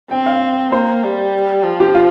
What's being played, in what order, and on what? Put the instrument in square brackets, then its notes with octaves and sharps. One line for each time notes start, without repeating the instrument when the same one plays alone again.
[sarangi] C4 [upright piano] G5
[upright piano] F5
[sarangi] A#3 [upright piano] C5
[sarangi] G3
F3
[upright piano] G4
F4